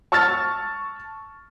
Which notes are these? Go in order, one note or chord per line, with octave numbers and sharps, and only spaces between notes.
A5 C#6 E6 F6 A6